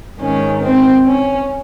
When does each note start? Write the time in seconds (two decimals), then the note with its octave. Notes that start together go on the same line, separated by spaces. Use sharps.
0.20 G#2 D#3 C#4
0.62 C4
1.06 C#4